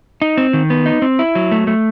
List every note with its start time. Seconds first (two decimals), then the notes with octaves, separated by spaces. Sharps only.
0.22 D#4
0.37 C4
0.53 D#3
0.70 B3
0.86 D#4
1.02 C4
1.19 E4
1.35 F#3
1.52 A3
1.67 A3